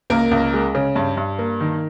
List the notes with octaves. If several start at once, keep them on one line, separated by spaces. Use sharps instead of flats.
C#2 A#3 A#4
C#2
G#3
C#3
G2
G2
A#3
D#3